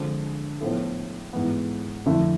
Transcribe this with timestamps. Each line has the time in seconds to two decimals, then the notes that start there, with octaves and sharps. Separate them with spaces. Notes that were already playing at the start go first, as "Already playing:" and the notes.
Already playing: D3 F3 G#3 C4 G#4
0.60 A2 F3 B3 E4 A4
1.33 G#2 E3 B3
2.06 F2 D3 A3 E4